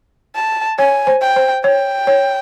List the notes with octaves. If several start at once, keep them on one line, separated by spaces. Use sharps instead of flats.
A5
C#5 G#5
C5
G5
C5
C#5 G5
C#5